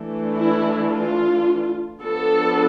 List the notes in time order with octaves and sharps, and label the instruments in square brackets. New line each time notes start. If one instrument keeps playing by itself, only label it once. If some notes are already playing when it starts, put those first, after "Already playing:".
Already playing: [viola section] E3 A3 D4
E4
F4
F3 B3 D4 A4